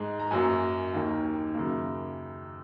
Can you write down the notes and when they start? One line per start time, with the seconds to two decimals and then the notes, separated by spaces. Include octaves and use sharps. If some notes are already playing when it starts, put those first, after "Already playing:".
Already playing: G#2 G#3
0.20 A#5
0.31 F#2 F#3 A#3 G#5
0.94 D#2 D#3 A#3
1.54 F#2 C#3 A#3